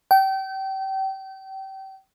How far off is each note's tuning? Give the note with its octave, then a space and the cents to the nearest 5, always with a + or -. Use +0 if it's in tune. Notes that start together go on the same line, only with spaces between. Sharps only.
G5 -30